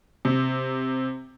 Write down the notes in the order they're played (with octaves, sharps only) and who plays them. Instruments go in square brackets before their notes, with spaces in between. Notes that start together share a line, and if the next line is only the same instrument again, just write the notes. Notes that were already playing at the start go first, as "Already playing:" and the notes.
[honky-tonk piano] C3